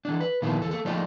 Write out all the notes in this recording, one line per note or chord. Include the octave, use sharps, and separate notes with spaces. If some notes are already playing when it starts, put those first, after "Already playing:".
E3 D4
B4
A#2 D#3 F3 B3 E4
E2 E3 A4
A#3 A4
F3 A3 A#3 D#4 F4 D5